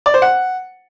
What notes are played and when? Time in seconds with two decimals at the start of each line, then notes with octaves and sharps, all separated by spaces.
0.06 D5
0.14 C5
0.22 F#5